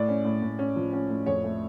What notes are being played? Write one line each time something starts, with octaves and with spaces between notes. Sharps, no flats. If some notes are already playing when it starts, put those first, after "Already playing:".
Already playing: A2 D5
C#4
A2
A2
C#4
F3
C#4
A2
F2 C#5
A3